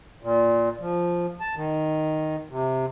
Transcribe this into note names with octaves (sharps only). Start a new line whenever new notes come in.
A#2
F3
A5
D#3
C3